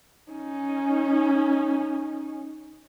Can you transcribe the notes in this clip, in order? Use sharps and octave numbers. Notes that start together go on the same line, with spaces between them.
C#4 D#4